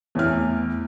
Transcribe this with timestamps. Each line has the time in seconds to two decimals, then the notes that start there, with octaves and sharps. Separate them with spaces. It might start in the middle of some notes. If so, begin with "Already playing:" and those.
0.15 E2 A2 E3 F6